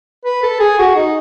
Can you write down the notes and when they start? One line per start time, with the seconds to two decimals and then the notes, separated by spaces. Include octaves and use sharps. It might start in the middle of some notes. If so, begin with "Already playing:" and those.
0.25 B4
0.43 A4
0.60 G#4
0.79 F#4
0.96 D#4